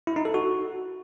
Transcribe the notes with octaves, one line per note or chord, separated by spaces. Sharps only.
E4
D#4
A4
F#4